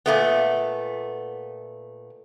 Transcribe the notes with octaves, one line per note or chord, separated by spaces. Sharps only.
A#2 A3 B3